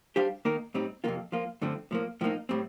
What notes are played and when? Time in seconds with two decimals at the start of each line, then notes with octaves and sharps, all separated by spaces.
0.16 G3 D4 G4 C5 F5
0.45 D#3 A#3 D#4 A#4
0.74 A2 G3 C4 D#4
1.04 F2 C3 D#3 A#3 F4
1.32 F3 A#3 F4
1.62 G2 D3 F3 A3 C4
1.91 A2 F3 A#3
2.21 A2 F3 A#3 D#4
2.49 A2 G3 C4